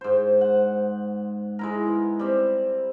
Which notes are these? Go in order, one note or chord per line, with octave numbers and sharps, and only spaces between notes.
G#2 C5
F#5
G#3 E4 A#4
B3
G3 C4